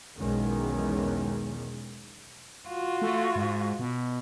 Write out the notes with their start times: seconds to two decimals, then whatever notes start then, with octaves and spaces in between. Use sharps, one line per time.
0.17 B1 E2 D#3 G#3 C#4
2.69 F4 F#4
3.02 A3
3.36 G#2
3.79 B2